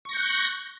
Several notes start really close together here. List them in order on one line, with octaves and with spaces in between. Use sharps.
C#6 A#6 G6 F#6